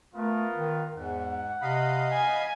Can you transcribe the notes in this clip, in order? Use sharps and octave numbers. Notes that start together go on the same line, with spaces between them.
A3 B3 F4 A#4
D#3
E2 G#2 F#5
C3 D#5 F5 B5
G#5